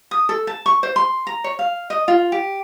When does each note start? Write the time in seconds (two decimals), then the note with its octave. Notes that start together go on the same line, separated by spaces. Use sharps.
0.11 D#6
0.29 A4
0.47 A5
0.66 C#6
0.83 C5
0.96 C6
1.27 A#5
1.44 C#5
1.59 F5
1.90 D#5
2.08 F4
2.32 G4